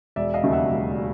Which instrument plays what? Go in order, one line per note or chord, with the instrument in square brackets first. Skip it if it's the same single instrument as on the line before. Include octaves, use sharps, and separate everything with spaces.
[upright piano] E1 D5 E5
D#5 F5
D#2 C#3 F#3 A3
E5 F#5
E1